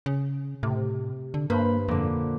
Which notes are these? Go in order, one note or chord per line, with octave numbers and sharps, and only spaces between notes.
C#3
A2 C3
D3
G2 A#3 B4 C5 B5
F2 A#2 D3